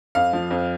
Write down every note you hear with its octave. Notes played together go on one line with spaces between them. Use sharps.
F2 F5
F3
F2